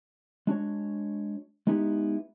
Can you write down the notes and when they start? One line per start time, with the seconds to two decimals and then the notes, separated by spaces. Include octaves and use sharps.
0.47 G#3 D4 F#4 C#5
1.67 G#3 B3 D#4 E4 G4